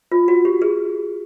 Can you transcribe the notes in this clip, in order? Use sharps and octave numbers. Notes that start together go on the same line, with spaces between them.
F4
F#4
G4
G#4